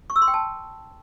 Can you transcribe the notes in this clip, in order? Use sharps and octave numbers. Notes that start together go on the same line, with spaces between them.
C#6
E6
C6
G5
A5